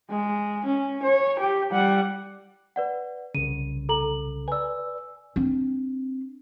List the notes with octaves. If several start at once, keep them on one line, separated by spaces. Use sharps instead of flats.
G#3
C#4
C#5
G4
G3 F#5
B4 D5 F#5
C2 C#3 D#7
A4 A#5 F#7
B4 D5 G#5 E6
C4 D4